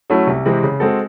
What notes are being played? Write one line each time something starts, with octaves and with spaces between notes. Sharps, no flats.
F#3 A3 C#4 E4
C2
C3 E3 G#3 C4
C#3
G#3 C4 F#4 A4